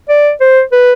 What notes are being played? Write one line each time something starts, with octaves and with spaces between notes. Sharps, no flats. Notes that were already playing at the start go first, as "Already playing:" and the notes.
D5
C5
B4